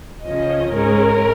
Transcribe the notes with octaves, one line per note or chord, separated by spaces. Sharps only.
C#2 C#3 F3 C#4 D#5
G#2 G#3 C#4 A#4